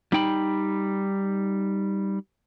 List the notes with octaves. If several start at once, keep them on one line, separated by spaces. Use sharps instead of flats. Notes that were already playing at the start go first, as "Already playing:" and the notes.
G3 D#4 G5 B5